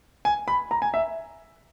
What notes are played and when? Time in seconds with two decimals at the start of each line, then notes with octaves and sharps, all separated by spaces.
0.25 G#5
0.48 B5
0.71 A#5
0.82 G#5
0.94 E5